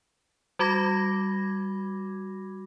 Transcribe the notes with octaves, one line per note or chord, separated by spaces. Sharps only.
G3 F#4 B5 D6 G#6 A#6